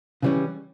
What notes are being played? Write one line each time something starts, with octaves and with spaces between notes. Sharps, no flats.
C#3 E3 G3 C#4